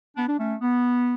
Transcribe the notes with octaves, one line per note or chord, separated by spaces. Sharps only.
B3 D4
D4
A3 C#4
B3